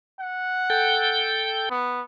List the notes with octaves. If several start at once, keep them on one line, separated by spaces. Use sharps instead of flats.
F#5
A4 G5 G6
B3